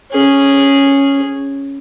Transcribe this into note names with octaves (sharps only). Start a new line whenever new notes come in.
C#4 G#4